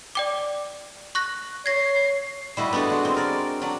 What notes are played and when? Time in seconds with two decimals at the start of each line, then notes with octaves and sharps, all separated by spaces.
0.15 D5 G5 D6
1.15 C#6 F#6 A#6
1.66 C#5 G#6 A#6 C7
2.57 G3 E4 F#4 D#5
2.73 B3 D4 F#4 A4
2.90 G#3 F#4
3.05 C4
3.16 A#4 D5
3.62 F#3 D4